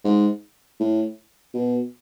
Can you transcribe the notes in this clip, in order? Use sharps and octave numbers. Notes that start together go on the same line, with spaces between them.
G#2
A2
B2